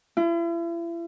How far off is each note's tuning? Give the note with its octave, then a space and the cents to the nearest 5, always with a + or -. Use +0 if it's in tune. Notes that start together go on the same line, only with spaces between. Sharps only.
E4 +40